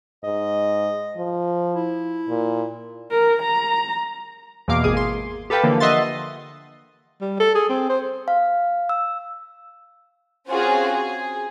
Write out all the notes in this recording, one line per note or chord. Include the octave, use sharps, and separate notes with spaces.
G#2 D#5
F3
E4
A#2
A#4
A#5
E2 B2 A#3 F5 D6
G#1 G#4 D#6
C6
G4 A4 B4 F5 G5 A5
D3 E3 F3 A#3
D#5 E5 F#5 C6 A6
G3
A4
G#4
C4
C5
F5
E6
C4 C#4 F4 F#4 G#4
G#4